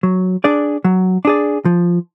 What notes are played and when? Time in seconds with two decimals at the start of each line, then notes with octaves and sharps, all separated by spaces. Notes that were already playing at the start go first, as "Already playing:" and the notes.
0.03 F#3
0.44 D4 G#4 D5
0.84 F#3
1.25 D4 G#4 D5
1.65 F3